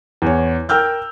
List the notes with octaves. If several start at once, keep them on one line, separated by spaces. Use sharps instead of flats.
E2 C#5
A#4 G5 E6 F6 G6